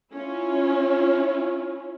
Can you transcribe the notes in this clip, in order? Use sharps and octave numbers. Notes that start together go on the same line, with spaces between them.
C#4 E4 F4